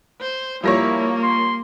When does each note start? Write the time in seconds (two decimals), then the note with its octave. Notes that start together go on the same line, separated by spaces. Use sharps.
0.20 C5
0.64 F3 G3 A#3 E4 A#4 C#5 A#6
1.23 C6